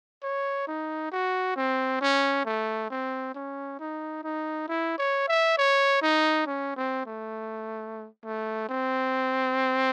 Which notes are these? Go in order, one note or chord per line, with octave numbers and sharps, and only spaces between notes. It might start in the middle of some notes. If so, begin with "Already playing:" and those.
C#5
D#4
F#4
C4
C#4
A3
C4
C#4
D#4
D#4
E4
C#5
E5
C#5
D#4
C#4
C4
A3
A3
C4